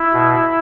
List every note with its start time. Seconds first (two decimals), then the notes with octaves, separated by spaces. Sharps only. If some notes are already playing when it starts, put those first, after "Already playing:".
Already playing: E4
0.13 B2